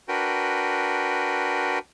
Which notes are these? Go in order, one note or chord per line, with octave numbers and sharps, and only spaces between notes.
D4 F#4 A#4 B4 G5